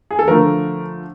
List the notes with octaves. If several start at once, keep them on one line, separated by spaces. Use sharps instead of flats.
G#4
A4
D3 F3 A3 A#4